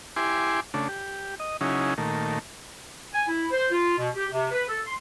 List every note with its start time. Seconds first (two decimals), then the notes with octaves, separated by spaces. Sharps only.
0.16 E4 G4 G#5 C6 D6
0.74 C#3 A3 D4
0.89 G4
1.40 D#5
1.61 C#3 F#3 C#4 D#4 E4 G#4
1.98 A#2 D#3 A3
3.13 G#5
3.28 E4
3.51 C5
3.71 F4
3.98 B2
4.15 G4
4.31 C3
4.52 B4
4.68 A4
4.87 C6